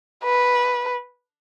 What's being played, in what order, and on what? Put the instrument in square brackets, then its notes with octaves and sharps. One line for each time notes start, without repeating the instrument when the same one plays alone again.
[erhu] B4